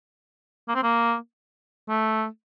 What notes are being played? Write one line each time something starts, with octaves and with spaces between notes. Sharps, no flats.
A#3
C4
A#3
A3